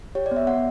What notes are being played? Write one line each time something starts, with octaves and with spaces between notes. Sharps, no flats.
G4 C#5
D5
B3
E5
B3 F#5